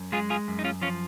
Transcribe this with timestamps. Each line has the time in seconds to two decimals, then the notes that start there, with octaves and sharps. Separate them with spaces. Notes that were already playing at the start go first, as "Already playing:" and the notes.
Already playing: F#2
0.12 G#3 F4 G#4
0.30 F4 G#4
0.48 F#2
0.59 D#4
0.64 C#4 F4
0.82 F3 C#4 F4